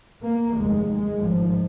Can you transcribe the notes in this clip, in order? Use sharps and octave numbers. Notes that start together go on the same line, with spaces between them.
A#3
F1 D#2 G#3
G#3
G#1 G#2 F3